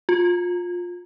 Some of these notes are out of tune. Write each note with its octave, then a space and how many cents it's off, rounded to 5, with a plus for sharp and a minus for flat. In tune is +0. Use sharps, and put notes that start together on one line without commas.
F4 +20